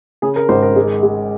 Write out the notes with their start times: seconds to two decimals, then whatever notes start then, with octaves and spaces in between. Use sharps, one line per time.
0.22 C#3 G#4
0.36 A#4
0.49 G#1 C5
0.63 A#4
0.76 G#3
1.03 G#3